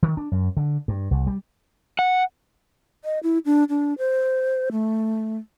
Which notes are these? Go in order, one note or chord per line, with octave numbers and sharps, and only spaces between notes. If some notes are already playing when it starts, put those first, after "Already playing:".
D#3
D4
F#2
D3
G2
C2
G3
F#5
D#5
E4
D4
D4
C5
A3